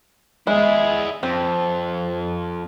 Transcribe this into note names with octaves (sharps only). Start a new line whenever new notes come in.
G#3 E4 G#4
F2 C4